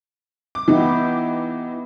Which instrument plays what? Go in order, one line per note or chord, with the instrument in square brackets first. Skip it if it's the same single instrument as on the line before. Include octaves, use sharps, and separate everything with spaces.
[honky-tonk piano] D6
[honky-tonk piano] E3 D#4 [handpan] B3 E4 G4